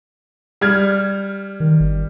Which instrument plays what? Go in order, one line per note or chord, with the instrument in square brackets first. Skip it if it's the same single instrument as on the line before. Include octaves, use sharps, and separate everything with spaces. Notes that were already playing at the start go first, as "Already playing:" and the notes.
[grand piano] G3 F6 G#6
[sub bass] D#3
G1